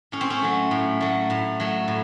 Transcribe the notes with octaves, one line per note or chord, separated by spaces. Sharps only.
A2 C#4
C4
C#4
F#3 A3
A2
F#3 A3
A2
F#3 A3
A2